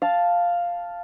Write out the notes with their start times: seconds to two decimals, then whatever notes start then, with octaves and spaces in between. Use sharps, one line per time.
0.02 F5 A5